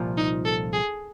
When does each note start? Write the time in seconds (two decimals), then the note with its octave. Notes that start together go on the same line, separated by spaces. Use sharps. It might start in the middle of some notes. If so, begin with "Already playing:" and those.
Already playing: C2 A#2 F3
0.17 D#4
0.45 A4
0.73 G#4